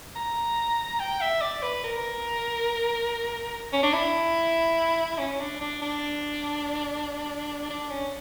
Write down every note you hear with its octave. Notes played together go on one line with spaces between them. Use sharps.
A#5
G5
E5
D5
B4
A#4
C#4
D4
E4
C#4
D4
D4
D4
D4
C#4